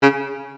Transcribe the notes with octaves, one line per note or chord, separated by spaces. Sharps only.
C#3